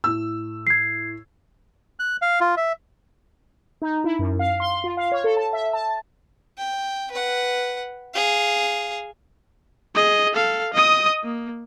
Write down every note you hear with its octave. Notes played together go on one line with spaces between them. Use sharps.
A2 E6
G#6 C7
F#6
F5
F4
E5
D#4
E4
F#2
F5
C6
F4
F5
C#5
A4
A5
E5
A5
G5
B4 F#5
G#4 F5
G#4 D#5
A4 F5
D#5 D#6
A#3